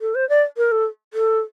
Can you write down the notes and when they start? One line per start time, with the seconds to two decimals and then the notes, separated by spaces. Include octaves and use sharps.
0.01 A4
0.15 C5
0.29 D5
0.57 A#4
0.72 A4
1.14 A4